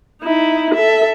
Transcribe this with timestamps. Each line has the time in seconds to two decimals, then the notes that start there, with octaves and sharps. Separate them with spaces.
0.22 D#4 E4
0.74 A4 E5